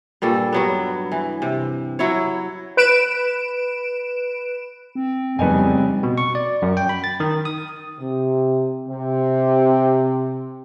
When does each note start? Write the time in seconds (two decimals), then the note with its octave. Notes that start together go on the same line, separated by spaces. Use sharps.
0.22 G2 A#2 G3 A4
0.53 G2 F#3 B3
1.12 E3
1.42 C3
1.99 F#3 E4 C#5
2.77 B4 D7 E7
4.95 C4
5.39 F2 A2 C#3 G3 B3 D#4 G#5
6.03 B2
6.18 C#6
6.35 D5
6.62 F#2
6.77 G5
6.89 B5
7.04 A6
7.20 D#3
7.45 D#6
7.98 C3
8.88 C3